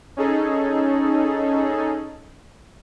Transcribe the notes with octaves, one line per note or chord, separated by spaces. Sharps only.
C#4 D#4 G#4 A4